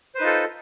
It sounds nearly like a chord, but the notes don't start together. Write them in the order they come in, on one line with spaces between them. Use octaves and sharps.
C5 B4 D#4 F4 A4